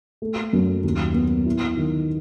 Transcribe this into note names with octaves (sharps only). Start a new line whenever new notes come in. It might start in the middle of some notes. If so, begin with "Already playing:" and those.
A3
F#2
D#2
B3
E4
D#3